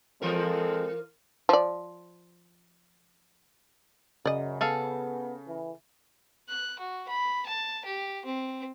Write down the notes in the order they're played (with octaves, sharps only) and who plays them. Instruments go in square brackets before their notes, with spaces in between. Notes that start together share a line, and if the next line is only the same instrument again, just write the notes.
[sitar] E3 F4 A#4 [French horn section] G#3 C4 A4
[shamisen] F3 D5
[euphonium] F#2 [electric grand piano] C#3 [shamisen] D5 D#5
[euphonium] B3 [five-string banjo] G#4 A4 F5
[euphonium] E3
[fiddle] F#6
F#4
B5
A5
G4
C4